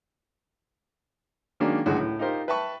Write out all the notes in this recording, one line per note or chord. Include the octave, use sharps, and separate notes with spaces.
D#3 F#3 G#3 A#3 C#4 D4
C#2 A2 D3 F#3 G#3 F#4
A2
D#4 F4 G4 A#4 C5
B4 E5 G5 A5 B5 C#6